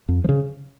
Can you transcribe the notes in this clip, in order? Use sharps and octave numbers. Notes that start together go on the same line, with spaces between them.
F2
F3
C#3